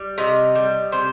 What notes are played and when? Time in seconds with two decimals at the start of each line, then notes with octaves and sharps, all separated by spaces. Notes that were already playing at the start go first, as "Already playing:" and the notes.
Already playing: G3
0.18 C3 D#5
0.55 G3
0.92 C3 C5